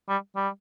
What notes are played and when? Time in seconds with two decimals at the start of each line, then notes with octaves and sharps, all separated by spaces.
0.09 G3
0.36 G3